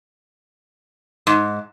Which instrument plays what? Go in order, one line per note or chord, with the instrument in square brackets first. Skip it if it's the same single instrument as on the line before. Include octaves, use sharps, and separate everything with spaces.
[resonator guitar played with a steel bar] G#2